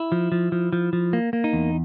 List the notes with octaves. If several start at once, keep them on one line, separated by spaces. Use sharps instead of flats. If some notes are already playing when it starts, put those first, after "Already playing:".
Already playing: E4
F3
F3
F3
F3
F3
A#3
A#3
D#4
E2